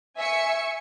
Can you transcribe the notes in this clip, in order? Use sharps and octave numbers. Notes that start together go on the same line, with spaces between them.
E5 G#5 C#6 C#7